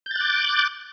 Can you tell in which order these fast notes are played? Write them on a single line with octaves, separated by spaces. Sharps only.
G6 A6 F#6 D6